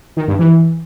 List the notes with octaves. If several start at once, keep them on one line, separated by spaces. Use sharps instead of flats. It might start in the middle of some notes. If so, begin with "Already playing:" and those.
D#3
G2
E3